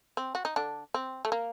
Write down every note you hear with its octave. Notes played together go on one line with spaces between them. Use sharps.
C4
F#4
D#4
D3 D4
C4
A3
A#3